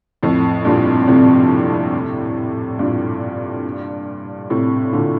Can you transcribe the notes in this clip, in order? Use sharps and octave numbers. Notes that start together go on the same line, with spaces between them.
F2 A2
G2 A#2
A2 C3
G2 A#2
A2 C3
A#2 D3